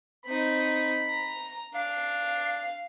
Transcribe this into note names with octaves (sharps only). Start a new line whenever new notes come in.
C4 D#4 B5
A#5
D4 F5